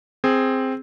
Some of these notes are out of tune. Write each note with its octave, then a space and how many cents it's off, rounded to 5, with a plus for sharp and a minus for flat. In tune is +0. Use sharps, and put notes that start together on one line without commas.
C4 +0 G#4 +0